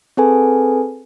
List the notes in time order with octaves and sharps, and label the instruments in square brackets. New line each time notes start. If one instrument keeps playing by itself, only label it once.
[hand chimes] C4 G#4 A4 B4 G#5